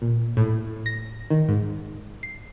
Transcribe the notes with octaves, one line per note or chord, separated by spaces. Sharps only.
A#2
A2
A#6
D#3
G#2
C7